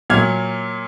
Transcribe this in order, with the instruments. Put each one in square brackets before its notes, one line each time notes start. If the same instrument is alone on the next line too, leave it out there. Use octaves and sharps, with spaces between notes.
[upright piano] A#2 F#3 F6 G#6